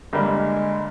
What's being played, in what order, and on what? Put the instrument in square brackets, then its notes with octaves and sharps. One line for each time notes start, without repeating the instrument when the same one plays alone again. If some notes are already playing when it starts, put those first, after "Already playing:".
[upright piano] G1 G2 G3 A#3 [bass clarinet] G#3